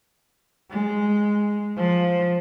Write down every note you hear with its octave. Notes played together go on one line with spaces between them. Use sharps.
G#3
F3